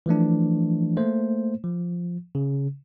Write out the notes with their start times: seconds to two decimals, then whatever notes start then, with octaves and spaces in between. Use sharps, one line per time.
0.06 E3 F3 A3 D4
0.97 A3 A#3 C5
1.64 F3
2.35 C#3